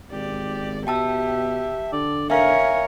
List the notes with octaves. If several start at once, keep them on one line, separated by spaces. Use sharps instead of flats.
G#1 G4 D5
B2 G4 E5 G5 A5 E6
D3 D5
A#4 C#5 E5 F5 G#5